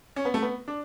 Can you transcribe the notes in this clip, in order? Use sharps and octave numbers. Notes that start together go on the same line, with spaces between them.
C#4
B3
A3
B3
D4